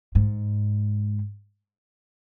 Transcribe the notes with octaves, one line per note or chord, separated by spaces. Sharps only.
G#2